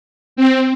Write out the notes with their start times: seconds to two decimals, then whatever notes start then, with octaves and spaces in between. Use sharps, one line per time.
0.36 C4